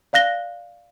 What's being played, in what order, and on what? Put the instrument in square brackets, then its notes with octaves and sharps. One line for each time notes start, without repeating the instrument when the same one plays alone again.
[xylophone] D5 F5 F#6 A#6 G7